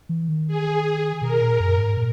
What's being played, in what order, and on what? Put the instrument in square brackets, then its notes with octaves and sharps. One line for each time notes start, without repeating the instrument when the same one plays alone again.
[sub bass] E3
D#3
[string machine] G#4
[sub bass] B2 [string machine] A#4
[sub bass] A#2
F#2
G#2
A#2